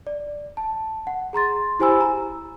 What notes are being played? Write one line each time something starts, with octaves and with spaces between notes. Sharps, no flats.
D5
A5
F#5
G#4 A#5 C6 A6
E4 G4 C5 G#5 B5 E6
A#5